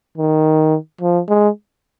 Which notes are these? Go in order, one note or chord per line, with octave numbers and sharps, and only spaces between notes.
D#3
F3
G#3